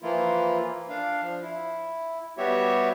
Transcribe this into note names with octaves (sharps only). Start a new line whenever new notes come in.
E3 F3 A#3 E4 F4
D4 F5
F3
E4
G3 B3 F#4 G4 C#5 E5